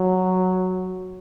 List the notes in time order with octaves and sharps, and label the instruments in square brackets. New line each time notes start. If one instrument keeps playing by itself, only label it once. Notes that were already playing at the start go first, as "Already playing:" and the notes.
Already playing: [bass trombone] F#3